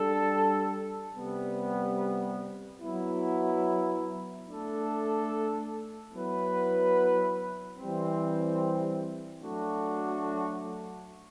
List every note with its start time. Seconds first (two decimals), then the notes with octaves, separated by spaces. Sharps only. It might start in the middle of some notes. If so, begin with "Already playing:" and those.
Already playing: G3 D4 A4
1.14 C3 G3 B3
2.80 F#3 B3 E4
4.46 A3 D4 A4
6.12 F#3 B3 E4 B4
7.78 E3 G3 C4
9.43 F#3 A3 D4 F#4